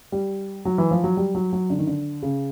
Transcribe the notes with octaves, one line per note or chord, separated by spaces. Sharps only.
G3
F#3
E3
F3
F#3
G3
F#3
F#3
D3
D#3
D3
C#3